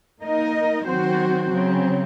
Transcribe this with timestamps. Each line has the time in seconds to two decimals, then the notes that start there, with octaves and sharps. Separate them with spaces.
0.22 A#3 D#4 A#4 D#5
0.86 D#3 F#3 C4 F#4 C5
1.51 C#3 F#3 C4